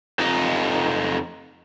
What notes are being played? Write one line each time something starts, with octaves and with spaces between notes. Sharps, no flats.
F2 D#4